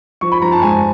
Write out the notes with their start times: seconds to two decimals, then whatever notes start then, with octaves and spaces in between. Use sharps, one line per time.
0.21 F3 C#6
0.32 B5
0.42 F3 A#5
0.52 A5
0.62 G#3 G#5